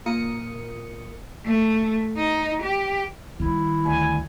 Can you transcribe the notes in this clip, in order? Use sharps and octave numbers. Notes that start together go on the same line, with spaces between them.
A#2 F4 A#4 D#6 C#7
A3
D#4
G4
D#3 G3 E4
D2 G#5